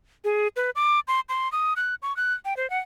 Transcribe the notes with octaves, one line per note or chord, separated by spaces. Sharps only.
G#4
B4
D6
C6
C6
D#6
F#6
C#6
F#6
G5
C5
F#5